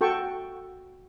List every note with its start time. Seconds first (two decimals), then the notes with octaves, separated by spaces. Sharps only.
0.01 F#4 A4 G5 C#6